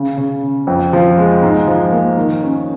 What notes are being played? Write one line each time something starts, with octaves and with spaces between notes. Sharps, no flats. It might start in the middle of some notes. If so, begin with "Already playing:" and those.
Already playing: C#3
C#3
C#3
F2
F3
G#3
G#2
F3
A#3
D#3
C#4